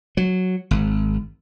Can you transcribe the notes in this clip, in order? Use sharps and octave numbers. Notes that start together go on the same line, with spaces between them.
F#3
G#1